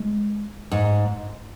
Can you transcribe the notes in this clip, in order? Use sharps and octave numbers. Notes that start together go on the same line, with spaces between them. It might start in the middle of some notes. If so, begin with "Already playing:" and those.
Already playing: G#3
G#2